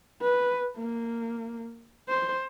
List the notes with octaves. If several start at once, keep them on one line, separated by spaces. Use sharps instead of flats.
B4
A#3
C5